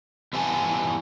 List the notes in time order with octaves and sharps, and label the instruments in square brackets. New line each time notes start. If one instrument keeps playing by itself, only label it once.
[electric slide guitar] E2 G3 B4 F5 G#5 A5